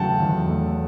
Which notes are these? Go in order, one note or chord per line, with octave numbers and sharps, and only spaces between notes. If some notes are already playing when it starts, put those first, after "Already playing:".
Already playing: E2 C#3 F#3 A3 F#5 G5 A5
E2
A3